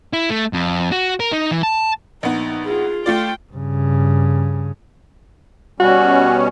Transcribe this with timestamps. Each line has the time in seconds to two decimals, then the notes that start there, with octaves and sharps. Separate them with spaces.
0.13 E4
0.30 A3
0.53 F2
0.92 F#4
1.20 A#4
1.32 D#4
1.51 E3
1.63 A5
2.23 A#1 B3 D#4
2.65 F4 G#4
3.06 A3 F4 D5 G5
3.53 G2 C#3
5.80 B2 G3 C#4 F#4